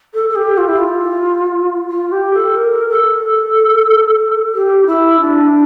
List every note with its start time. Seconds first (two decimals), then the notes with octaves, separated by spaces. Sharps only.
0.14 A4
0.29 A4
0.36 G4
0.58 F4
0.68 E4
0.78 F4
1.90 F4
2.12 G4
2.34 A4
2.56 A#4
2.90 A4
4.54 G4
4.87 E4
5.20 D4